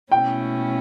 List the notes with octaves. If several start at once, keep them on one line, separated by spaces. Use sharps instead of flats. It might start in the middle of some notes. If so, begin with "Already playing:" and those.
B2 A3 C#4 E4 G5